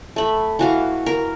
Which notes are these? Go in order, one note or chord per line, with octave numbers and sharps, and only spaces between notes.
A3 B5
E3 F#4 F5
A#4